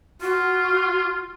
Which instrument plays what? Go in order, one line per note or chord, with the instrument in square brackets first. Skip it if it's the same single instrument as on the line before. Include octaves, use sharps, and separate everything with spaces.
[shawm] F4 [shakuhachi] F#4